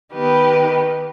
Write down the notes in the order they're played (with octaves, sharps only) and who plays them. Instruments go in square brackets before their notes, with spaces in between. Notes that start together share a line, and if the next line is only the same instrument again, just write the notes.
[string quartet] D#3 B3 G4 B4